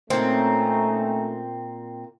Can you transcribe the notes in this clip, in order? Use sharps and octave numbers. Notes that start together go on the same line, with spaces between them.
A#2 A3 C4 C#4 D#4